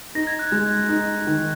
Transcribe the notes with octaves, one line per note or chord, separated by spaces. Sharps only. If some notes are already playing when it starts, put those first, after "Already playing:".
D#4 A#6
G#6
F#6
G#3 G#6
D#4
D#3